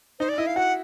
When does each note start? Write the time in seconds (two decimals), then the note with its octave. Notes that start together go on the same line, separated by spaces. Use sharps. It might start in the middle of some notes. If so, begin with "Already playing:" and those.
0.20 D#4 C5
0.29 D5
0.38 E4 D#5
0.47 F5
0.56 F#4 F#5